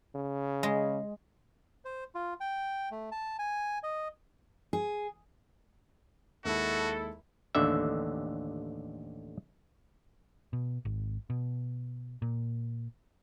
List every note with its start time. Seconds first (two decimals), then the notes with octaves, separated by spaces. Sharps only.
0.15 C#3
0.63 G#3
1.85 C5
2.15 F4
2.41 G5
2.91 A3
3.12 A5
3.39 G#5
3.83 D#5
4.73 G#4
6.45 D#2 G#3 E4 F#4 A4
7.55 A1 D#2 D3 E5
10.53 B2
10.85 G#1
11.30 B2
12.22 A#2